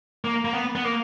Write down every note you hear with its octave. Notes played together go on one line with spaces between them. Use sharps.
A#3
A#3
B3
B3
A#3